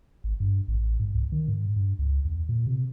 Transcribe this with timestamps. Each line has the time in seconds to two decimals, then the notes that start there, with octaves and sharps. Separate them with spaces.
0.24 G#1
0.40 G2
0.68 A1
1.00 G#2
1.15 C2
1.32 D#3
1.48 G#2
1.76 G2
1.99 C#2
2.25 E2
2.49 A#2
2.67 C3